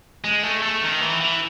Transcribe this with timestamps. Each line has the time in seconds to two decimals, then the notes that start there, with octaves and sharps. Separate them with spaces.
0.24 G#3
0.43 A3
0.62 A3
0.82 D#3
1.01 E3
1.21 E3